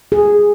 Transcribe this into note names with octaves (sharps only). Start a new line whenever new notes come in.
G#4